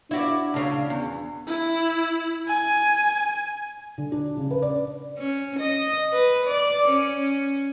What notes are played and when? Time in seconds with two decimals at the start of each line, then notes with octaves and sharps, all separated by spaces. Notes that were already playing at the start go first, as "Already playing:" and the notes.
0.11 D4 E4 F#4 D5
0.54 D2 C#3
0.90 E2
1.48 E4
2.48 G#5
3.98 D3
4.12 D4
4.37 C#3
4.51 B4
4.62 D5
5.18 C#4
5.59 D#5
6.12 B4
6.47 D5
6.88 C#4